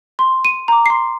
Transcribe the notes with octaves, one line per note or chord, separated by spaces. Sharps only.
C6
D#7
A#5 D6
C6 C7